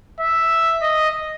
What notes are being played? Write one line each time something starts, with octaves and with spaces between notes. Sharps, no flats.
E5
D#5